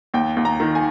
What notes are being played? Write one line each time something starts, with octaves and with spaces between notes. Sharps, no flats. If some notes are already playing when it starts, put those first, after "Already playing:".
D#2 G5
D#2
A#5
D#3
G#5